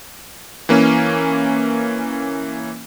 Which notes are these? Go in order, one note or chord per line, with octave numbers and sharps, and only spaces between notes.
E3 A#3 C#4